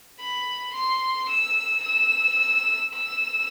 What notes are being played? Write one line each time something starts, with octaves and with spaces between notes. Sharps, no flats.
B5
C6
E6
E6
E6